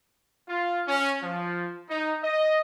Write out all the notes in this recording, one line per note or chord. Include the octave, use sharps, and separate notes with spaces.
F4
C#4
F3
D#4
D#5